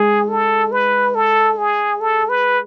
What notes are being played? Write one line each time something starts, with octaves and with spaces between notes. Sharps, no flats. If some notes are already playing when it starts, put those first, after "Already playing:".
Already playing: G#3 G#4
A4
B4
A4
G#4
A4
B4